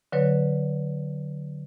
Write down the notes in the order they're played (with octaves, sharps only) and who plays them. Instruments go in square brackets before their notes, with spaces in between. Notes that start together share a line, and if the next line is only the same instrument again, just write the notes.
[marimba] D3 F#3 B4 C#5